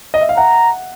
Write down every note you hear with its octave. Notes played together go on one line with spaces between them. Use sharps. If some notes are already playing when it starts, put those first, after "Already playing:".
D#5
E5
F5
E5 F#5 A#5